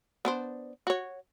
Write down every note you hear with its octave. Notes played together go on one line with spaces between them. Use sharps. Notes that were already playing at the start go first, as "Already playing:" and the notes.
B3 D4 C5
F#4 C#5